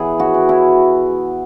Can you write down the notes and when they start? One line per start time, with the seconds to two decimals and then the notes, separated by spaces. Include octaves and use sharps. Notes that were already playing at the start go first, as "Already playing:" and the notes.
Already playing: E3 B3 G#4
0.20 F#4
0.34 E3
0.49 E4